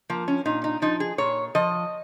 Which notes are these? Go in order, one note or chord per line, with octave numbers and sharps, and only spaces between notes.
F3 A#3
C#4
A#2 D#4
D#4
F3 D#4
G#4
A#2 C#5
F3 D#5